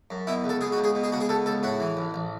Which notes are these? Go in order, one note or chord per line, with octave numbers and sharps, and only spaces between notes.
F#2
B2 E4
C#2
A4
B2 G#4
F#4
C#2
G#4
B2
G#4
C#2 F#4
G#4
B2 A4
C#2 A4
A2 F#4
E3
A1
A1